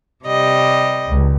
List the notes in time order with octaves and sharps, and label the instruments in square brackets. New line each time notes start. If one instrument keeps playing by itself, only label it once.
[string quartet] C3 G3 D#5
[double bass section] C#2